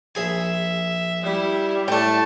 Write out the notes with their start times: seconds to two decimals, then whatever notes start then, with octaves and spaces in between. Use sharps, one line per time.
0.15 A#1 G#4 E5 G#5
1.24 G3 E4
1.88 A2 A3 G5 A5